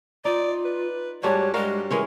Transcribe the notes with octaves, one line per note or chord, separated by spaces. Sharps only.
D#4 F4 D5
B4
G#2 G3 D4 F#4 C#5
G3 G#3 F#4 A#4 F5
E3 G#3 C#4 A#4